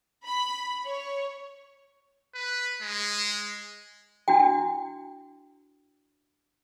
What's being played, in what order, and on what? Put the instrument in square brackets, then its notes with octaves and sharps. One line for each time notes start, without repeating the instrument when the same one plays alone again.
[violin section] B5
C#5
[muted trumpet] B4
G#3
[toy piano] D4 E4 F#4 G5